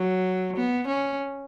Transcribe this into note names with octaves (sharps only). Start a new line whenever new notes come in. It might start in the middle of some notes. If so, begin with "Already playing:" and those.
Already playing: F#3
B3
C#4